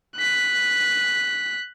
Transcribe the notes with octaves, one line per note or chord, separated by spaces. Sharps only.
F#6 B6